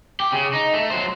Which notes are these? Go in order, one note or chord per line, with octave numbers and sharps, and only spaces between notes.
G4
C#3
D#4
A3
F#3 C5